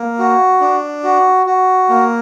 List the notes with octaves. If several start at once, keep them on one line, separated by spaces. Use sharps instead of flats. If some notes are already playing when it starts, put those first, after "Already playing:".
Already playing: A#3
F#4
D4
F#4
F#4
A#3